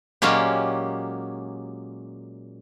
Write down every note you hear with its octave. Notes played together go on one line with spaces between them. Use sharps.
A#2 F#3 G#3 A#3 C#4 G4